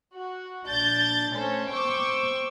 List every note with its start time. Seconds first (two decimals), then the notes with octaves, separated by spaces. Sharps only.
0.14 F#4
0.65 A#1 D4 G6 A6
1.32 A3 C#4 A4 C5
1.69 C5 G5 C#6 D6 E6